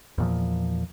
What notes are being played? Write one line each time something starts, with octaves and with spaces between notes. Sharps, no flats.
E2 A#2 F3